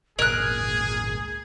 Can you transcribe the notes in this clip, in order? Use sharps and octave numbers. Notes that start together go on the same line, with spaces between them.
G#1 C#2 A#2 G#4 A#4 F#6 G#6